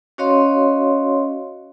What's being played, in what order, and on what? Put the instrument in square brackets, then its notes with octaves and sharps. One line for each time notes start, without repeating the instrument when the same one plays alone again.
[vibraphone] C#4 F#4 C#5 D#5 F5 C6